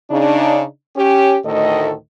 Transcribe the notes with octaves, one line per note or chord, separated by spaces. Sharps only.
C#3 D4 D#4
C#4 G4
D2 A2 D#3 A4 D#5